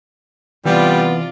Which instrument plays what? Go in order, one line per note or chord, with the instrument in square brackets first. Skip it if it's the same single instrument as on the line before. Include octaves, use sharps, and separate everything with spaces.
[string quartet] C3 F4 D5 [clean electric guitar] E3 [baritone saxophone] G3 [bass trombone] B3